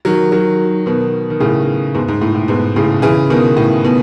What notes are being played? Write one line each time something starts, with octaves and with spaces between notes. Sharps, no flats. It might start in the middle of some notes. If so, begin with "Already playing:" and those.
D#3 F#3
D#3 F#3
B2 D#3
D#3
A2 C#3
G#2 B2
G#2
A2
A2
G#2 B2
A2 C#3
C#3 E3
B2 D#3
A2
B2